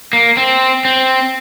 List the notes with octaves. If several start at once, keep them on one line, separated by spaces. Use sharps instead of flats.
A#3
C4
C4